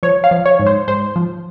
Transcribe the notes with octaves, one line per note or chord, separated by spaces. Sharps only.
F3 C#5
F5
F3
C#5
G#2
C5
G#2 C5
F3